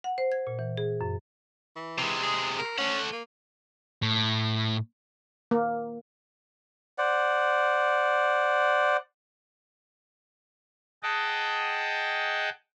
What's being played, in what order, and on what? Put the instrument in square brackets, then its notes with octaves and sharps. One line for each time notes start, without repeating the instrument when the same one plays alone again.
[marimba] F#5
C5
G#6
A#2
E3
G#4
F#2
[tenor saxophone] E3
[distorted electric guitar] C3 G#3
[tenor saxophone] G#4
A#4
[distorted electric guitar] A3 F#5 [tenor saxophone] C#4
[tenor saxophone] A#3
[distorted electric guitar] A2
[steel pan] A#3
[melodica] C5 D5 F#5
[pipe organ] G#4 D#5 F#5 G5 A5